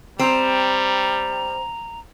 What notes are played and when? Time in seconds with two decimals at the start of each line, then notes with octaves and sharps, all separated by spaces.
0.19 G3 C4 A#5